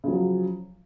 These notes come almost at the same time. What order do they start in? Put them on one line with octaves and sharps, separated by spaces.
C#3 F3 F#3